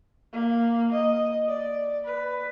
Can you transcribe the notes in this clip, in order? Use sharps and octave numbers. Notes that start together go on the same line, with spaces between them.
A#3
D#5
D5
B4